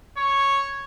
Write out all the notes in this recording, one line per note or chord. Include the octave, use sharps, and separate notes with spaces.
C#5